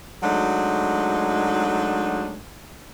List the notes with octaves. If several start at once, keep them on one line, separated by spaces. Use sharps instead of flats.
F#3 G#3 A3 D4 D#4 F#4